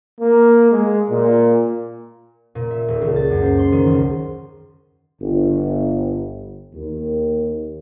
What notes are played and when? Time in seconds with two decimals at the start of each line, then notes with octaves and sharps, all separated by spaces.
0.20 A#3
0.72 G#3
1.10 A#2
2.55 A#2
2.71 E5
2.88 D#1
3.01 C#2
3.16 A6
3.30 F#2
3.42 C5
3.59 C6
3.72 D#3
3.86 C#2
5.20 G1
6.74 D#2